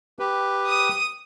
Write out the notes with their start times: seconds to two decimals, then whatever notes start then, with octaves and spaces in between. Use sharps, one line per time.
0.19 G4 B4
0.67 D#6 D#7